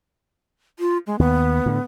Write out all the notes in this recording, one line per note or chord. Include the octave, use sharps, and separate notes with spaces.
F4
G#3
D#2 B3
A2 D3